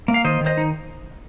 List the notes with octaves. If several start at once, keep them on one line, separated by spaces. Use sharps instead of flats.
A#3
F5
D#3 C5 D#5
D#3
C5 D#5
D#4